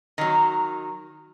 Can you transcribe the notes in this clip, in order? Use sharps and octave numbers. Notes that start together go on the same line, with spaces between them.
D#3 F#3